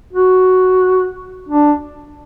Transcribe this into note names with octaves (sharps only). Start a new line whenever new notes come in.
F#4
D4